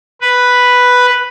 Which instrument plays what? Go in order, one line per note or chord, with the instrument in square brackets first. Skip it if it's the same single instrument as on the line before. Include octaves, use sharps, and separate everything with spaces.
[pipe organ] B4